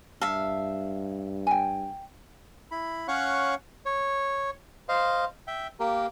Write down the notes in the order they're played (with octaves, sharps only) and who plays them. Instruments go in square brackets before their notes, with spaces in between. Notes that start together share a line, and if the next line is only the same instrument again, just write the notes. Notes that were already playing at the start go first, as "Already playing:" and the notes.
[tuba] G2 [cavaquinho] E5 F5 [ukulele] A5
[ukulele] G5 G#5
[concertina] E4 B5
C#4 C#5 F5 F#5 C#6 F#6
C#5
C5 D#5 F5
E5 G5
A#3 G4 A#4